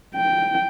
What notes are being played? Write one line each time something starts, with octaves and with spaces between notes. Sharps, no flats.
G5